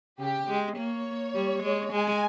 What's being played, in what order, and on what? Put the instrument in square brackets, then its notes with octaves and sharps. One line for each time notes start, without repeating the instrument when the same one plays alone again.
[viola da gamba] C#3 [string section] G4
[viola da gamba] G#3
[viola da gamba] A#3 [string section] C#5
[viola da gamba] G3
G#3
[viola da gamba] G#3 [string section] G#5